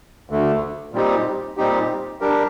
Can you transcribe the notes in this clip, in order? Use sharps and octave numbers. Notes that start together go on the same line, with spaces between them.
D2 D3 A3
A#2 G3 C4 D#4 G4
A#2 G3 C4 D#4 G4
G3 D4 G4 A#4